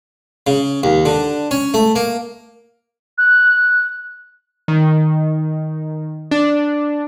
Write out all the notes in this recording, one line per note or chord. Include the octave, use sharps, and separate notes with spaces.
C#3
D#2
D3
C#4
A3
A#3
F#6
D#3
D4